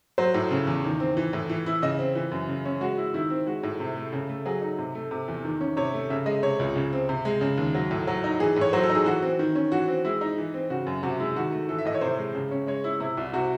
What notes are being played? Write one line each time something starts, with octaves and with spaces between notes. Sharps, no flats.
F#3 C5
A2
C#3
E2
D#3
C4
E3
A2
E3
E4
C#3 D#5
C4
E3
F#2
C#3
C#4
G#3 F#4
E4
D#3 E4
C4
G#3 F#4
A2
C3
A3
C#3
A3
F#3 G#4
D#4
C3
A3
C3
E2
D#3
C#4
C3 C#5
A3
C#3 E5
G#3 D#5
C3 C#5
C#2
C#3
C4
C3
G#3
C#3
D#2
F#3
A2
F#3
D#4
E3 G#4
A2 C#5
F#3 C5
A4
D#4
G#4
E3 F#4
C4
D#3
C#4
E3 F#4
C4
G#3 E4
D#4
E3
C4
C#3 F#4
F#2
C3 F#4
G#3 E4
D#3 F#4
A3
E3 A4
E5
A2 D#5
C#5
C3 C5
G#3
C#3
C#4
G#3 C#5
E4
C3 E4
C2
C3 F#4